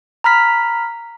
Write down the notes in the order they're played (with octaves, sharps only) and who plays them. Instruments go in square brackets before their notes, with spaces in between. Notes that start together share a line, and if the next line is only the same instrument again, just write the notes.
[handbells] A#5 B5 F6 B6